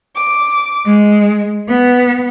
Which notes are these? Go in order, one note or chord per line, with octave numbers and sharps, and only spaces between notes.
D6
G#3
B3